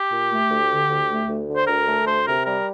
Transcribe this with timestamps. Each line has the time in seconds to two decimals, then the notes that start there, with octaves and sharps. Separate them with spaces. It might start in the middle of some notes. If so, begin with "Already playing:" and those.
Already playing: G4
0.12 A#2
0.31 A3
0.51 D2
0.69 D3
0.90 D2
1.09 A3
1.29 D2
1.48 D3
1.56 C5
1.66 D2 A#4
1.87 A3
2.05 D2 C5
2.25 C3 A#4
2.45 G3 A#4